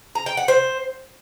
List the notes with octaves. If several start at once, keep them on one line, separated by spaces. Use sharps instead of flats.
A#5
G5
F#5
C5